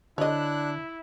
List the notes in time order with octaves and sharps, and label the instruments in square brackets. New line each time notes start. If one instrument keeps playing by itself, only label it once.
[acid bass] D3 [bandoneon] D4 F#6 [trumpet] E4 [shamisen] C#5 D#5